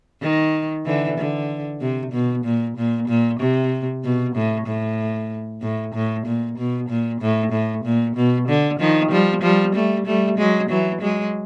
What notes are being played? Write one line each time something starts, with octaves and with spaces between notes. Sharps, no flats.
D#3
D3 E3
D3
C3
B2
A#2
A#2
A#2
C3
B2
A2
A2
A2
A2
A#2
B2
A#2
A2
A2
A#2
B2
D3
D#3 F3
F3 G3
F3 G3
G3 A3
G3 A3
F#3 G#3
E3 F#3
F#3 G#3